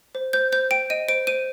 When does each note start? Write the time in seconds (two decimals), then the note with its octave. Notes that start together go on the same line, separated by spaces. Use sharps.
0.15 C5
0.33 C5 G6
0.52 C5 G6
0.71 G5 D7
0.90 D#5 D#7
1.08 C5 D7
1.27 C5 D#7